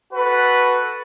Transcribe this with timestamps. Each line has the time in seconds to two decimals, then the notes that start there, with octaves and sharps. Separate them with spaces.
0.13 F#4 A4 B4